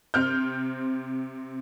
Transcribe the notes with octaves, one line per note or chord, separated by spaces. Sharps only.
C3 C4 F6 G6